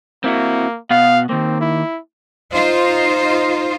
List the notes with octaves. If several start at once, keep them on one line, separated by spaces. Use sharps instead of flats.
A#3 C4 E4 F#4
B2 B3 F5 F#5
D#3 A#3 C4
E4
D#4 F4 C5